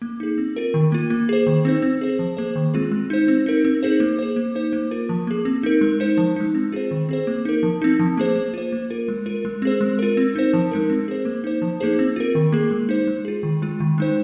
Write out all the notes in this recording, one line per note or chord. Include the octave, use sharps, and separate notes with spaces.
A#3
D#4 G#4
C4
F4 A#4
D#3
A#3 F4
A#3
G#4 C5
D#3
C4 D#4 C5
C4
G#4 C5
F3
A#3 G#4 C5
D#3
G#3 C4 F4 G#4
G#3
D#4 C5
C4
D#4 A#4
C4
D#4 G#4 C5
A#3
G#4 C5
A#3
D#4 C5
A#3
F4 A#4
F3
A#3 G#4
C4
D#4 A#4
G#3
D#4 C5
F3
G#3 D#4
C4
F4 G#4 C5
D#3
C4 G#4 C5
A#3
D#4 A#4
F3
C4 D#4
F3
A#3 G#4 C5
A#3
F4 C5
A#3
F4 A#4
G#3
F4 A#4
G#3
C4 G#4 C5
G#3
F4 A#4
C4
D#4 C5
F3
G#3 D#4 A#4
C4
G#4 C5
A#3
D#4 C5
F3
A#3 D#4 G#4 C5
C4
F4 A#4
D#3
A#3 G#4
G#3
D#4 C5
G#3
F4 G#4
D#3
G#3 F4
D#3
G#3 D#4 C5